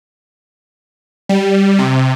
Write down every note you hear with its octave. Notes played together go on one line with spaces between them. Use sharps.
G3
C3